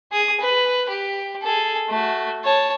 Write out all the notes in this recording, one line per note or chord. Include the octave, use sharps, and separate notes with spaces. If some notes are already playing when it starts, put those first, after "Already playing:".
G#4 D#6
B4
G4
G#4 A4
A3 F#4
C#5 A5